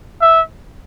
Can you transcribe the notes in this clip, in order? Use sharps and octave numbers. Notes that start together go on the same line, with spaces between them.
E5